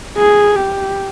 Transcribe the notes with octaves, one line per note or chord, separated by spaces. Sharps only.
G#4
G4